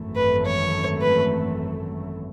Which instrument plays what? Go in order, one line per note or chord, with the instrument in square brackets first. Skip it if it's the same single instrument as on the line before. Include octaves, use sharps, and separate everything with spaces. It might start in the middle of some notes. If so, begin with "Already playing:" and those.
Already playing: [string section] G#1 F#2 E3 A3
[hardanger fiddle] B4
C#5
B4